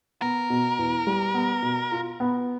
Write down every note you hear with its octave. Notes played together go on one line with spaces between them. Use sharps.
B3 A#4
B2
E2
G3
B3
B2
F4
B3